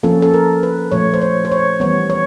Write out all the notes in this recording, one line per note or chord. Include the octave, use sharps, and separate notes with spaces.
F3 A#3 C#4 A4
A4
A#4
B4
A#2 F3 A3 C#5
C5
C#5
C5
C#5
E3 G3 B3 C#5
C#5